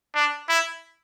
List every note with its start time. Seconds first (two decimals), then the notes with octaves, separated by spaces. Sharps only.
0.15 D4
0.49 E4